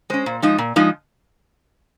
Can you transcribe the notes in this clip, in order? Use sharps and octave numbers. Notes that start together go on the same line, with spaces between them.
G#3 C#4 C5
A#2
F3 G#3 D#4
A#2
F3 G#3 D#4